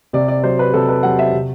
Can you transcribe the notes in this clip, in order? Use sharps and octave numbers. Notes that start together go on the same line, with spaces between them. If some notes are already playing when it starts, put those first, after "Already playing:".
C3 D5
D5
F#3 C5
B4
C3 A4
B4
F#3 F#5
E5
C3